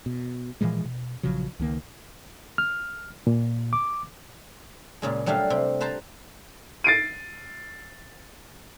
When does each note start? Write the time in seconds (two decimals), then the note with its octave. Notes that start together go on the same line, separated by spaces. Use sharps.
0.06 B2
0.61 A#2 E3 F3 G#3
0.85 B2
1.23 A#1 C#3 F3 F#3
1.59 C#2 D#3 A#3
2.58 F6
3.27 A#2
3.73 D6
5.02 A#2 C#3 G#3
5.26 F#3 G3 A3 D4 F5
5.50 C3
5.80 B4 C5 A5 A#5 C6
6.84 A6 C7 D7 D#7